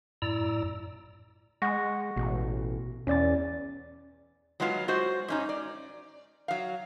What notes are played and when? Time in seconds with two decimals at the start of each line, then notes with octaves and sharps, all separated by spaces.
0.22 F#2 A2 E4 D5 A#5 E6
1.62 G#3 F#5 C#6 A#6
2.16 A1 B2
3.07 E2 C#4 D5 A6
4.60 F#3 G#3 B3 F4
4.88 G#3 F#4 C5
5.28 G#2 C#4 D#4
5.49 D5
6.48 F#3 F5